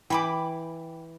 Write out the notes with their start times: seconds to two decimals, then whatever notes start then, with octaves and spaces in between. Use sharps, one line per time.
0.10 E3 G5 B5 D6